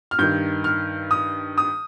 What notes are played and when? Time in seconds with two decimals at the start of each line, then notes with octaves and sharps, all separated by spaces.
0.11 F6
0.18 G2 D#3 G6
0.64 F6
1.11 D#6
1.58 D#6